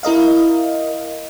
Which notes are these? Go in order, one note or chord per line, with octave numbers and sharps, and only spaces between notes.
E4 A#4 D#5 F5